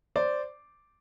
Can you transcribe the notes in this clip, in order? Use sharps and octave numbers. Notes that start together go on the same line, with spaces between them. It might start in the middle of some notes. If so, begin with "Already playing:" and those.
C5 D5